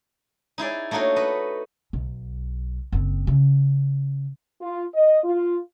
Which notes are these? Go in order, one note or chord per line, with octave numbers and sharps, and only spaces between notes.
D#4 E4 G#4 D5
A3 A#3 D4 D#4 F#4 C#5
B4 D#5
B1
F#1 C4
C#3
F4
D#5
F4